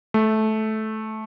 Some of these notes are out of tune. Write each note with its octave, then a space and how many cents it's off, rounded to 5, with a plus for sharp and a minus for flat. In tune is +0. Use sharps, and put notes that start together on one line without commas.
A3 -15